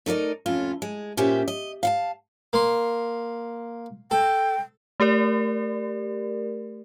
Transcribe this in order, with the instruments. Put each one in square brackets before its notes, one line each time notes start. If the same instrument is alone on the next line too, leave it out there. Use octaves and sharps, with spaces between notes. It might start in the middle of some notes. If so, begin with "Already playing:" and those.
[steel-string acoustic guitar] A3 D#4 A#4 D5 D#5
F2 A2 C#4 F4
G#3
A#2 C#4 G4 C5 E5 G5
D#5
F5 F#5 A5
[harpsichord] A#3 C6
[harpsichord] A4 [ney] G5
[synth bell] A3 G4 A#4 D5